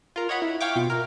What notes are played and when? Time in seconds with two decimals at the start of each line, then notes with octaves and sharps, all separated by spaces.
0.16 F4 A#4
0.29 C#5 D#5 F#5 B5
0.42 E4
0.61 C#5 F5 G5 C#6 D6
0.76 B2 F4
0.90 A#4